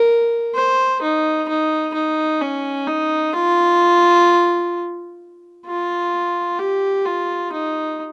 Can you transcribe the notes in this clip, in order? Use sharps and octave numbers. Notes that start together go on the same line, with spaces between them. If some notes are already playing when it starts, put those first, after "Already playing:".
Already playing: A#4
C5
D#4
D#4
D#4
C#4
D#4
F4
F4
G4
F4
D#4